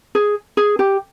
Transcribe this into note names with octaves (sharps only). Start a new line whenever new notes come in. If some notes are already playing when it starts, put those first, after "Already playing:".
G#4
G#4
G4